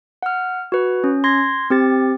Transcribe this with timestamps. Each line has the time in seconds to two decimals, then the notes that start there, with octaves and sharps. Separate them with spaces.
0.23 F#5 F6
0.72 F#4 B4
1.04 C#4
1.24 C6 G#6 A#6
1.70 C4 G4 A6